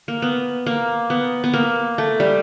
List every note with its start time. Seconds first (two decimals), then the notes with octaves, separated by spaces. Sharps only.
0.08 A#3
0.22 B3
0.66 A#3
1.10 B3
1.44 B3
1.53 A#3
1.98 A3
2.20 G3